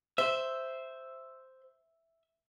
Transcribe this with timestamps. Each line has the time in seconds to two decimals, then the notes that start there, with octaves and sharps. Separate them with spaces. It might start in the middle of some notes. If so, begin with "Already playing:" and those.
0.18 C5 E5